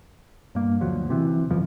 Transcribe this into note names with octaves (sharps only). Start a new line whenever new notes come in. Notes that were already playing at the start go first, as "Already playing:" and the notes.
G2 A#3
D2 F3 F#3
C3 E3
G1 F2 E3 F3